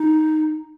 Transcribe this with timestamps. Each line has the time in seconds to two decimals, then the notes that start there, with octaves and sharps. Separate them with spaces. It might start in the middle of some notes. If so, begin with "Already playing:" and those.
Already playing: D#4